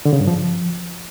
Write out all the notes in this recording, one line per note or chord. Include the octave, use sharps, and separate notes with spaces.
D3
C#3
G2
F3